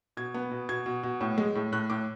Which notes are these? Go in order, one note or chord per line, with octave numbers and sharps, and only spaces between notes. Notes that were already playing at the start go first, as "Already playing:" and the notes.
B2 G#6
B3
B2
B2 G#6
B2
B2
A2
G#3
A2
A2 F#6
A2 D6